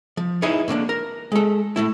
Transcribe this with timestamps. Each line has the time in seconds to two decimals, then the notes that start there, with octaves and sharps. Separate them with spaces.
0.17 F3
0.42 D#4 E4 G#4 B4 C#5 D#5
0.68 A2 D3 A#3 D4
0.89 A#4
1.32 G#3 A4
1.76 A2 A3 E4